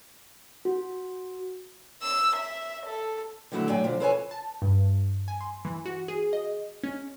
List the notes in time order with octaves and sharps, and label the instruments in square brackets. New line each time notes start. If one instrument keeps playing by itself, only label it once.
[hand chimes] F#4
[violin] E6
E5
A4
[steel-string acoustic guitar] D3 D#3 F#3 A3 E4 F#4
A2 F#3 D5 G5 G#5
D3 F3
F4 A4 B4 C#5 D5 G#5
[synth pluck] A5
G2
G#5
C6
E3
F#4
G#4
D#5
C#4